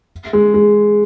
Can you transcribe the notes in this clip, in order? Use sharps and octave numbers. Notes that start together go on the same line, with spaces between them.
G#3
G#3